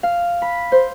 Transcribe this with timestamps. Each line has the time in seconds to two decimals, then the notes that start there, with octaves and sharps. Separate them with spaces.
0.03 F5
0.42 B5
0.72 C5